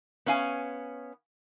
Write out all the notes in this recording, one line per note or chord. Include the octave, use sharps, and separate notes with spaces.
B3 C#4 F5 G#5